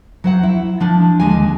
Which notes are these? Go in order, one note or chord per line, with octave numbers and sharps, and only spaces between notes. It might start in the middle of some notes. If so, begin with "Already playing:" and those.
F#3 C5 F#5
E4
F3 D4
D#2 D3 G#3 A#3 G#5